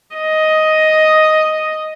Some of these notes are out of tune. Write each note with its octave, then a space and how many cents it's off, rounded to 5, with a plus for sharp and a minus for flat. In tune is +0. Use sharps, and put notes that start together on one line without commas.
D#5 +5